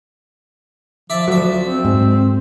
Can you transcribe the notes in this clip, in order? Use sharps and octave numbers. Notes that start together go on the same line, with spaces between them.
F3 D5 E5 A5
D2 F#3 E5
C4
G#2